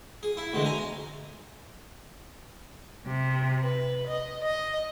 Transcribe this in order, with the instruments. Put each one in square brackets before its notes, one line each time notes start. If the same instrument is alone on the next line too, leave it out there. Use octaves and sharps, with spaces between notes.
[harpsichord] G#4
E4
D2 B2 E3 G#3
G#5 A#5
[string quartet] C3
B4
D#5
D#5